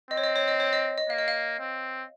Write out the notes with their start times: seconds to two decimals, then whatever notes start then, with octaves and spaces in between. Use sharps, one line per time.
0.11 C4 D#5
0.17 C#5
0.23 D#5
0.36 C#5
0.48 D#5
0.60 C#5
0.73 D#5
0.98 D#5
1.10 A#3 F5
1.18 D#5
1.28 F5
1.59 C4